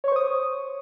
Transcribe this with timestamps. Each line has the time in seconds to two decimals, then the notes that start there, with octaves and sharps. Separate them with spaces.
0.04 C#5
0.08 C#6
0.12 C5
0.16 D#6